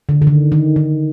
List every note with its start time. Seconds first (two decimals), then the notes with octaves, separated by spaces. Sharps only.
0.09 D3
0.22 D3
0.27 D#3
0.52 D#3
0.76 D#3